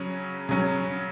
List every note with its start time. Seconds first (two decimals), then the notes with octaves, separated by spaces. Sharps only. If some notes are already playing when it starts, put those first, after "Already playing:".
Already playing: C#3 F#3 C#4
0.49 C#3 F#3 C#4